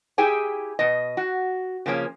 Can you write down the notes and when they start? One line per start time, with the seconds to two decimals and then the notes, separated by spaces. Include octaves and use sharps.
0.18 E4 G4 G#4 G5 G#5
0.79 B2 D#5
1.17 F#4
1.86 C#3 F3 A#3 C#4